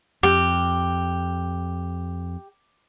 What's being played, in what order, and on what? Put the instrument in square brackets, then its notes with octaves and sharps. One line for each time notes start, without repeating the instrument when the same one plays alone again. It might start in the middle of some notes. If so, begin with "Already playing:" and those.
[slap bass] F2 [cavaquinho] G4